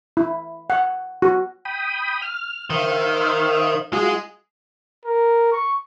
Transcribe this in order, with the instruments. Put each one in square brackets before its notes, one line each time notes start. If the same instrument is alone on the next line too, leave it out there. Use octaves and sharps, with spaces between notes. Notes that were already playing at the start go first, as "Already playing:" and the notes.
[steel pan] E4
F#5
F#4
[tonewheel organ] G5 B5 D#6
F6
[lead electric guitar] D#3 [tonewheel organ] C5 E5 F5
[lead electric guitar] G#3 G#4 [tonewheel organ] F4 F#4
[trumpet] A#4
C#6